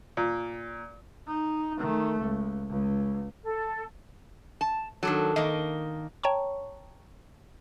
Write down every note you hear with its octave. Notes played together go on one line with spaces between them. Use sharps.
A#2
D#4
D#3 A3
C#2
C#2
A4
A5
D#3 F#3 D4 A4
D#3 A#3 D#5
C#5 G5 A5 A#5 C#6